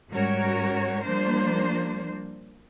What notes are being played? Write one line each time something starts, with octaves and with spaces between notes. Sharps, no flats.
G#2 G3 C#4 F#4 A#4 C#5
F3 G3 A#3 D4 C5